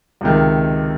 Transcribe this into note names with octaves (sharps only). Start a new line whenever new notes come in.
C#2 C3 D#3